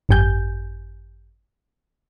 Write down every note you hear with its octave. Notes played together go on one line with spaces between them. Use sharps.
G#1 F#2 G4 G#5 G6